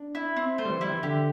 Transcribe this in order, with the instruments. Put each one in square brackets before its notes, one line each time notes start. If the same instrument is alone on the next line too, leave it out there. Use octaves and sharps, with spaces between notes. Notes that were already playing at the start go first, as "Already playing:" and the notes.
Already playing: [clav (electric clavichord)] D4
[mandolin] E4
C4
[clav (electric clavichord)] A3 [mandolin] C5
[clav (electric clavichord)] G3
E3
[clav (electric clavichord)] G3 [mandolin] E4
[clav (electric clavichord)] E3
[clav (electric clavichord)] D3 [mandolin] G4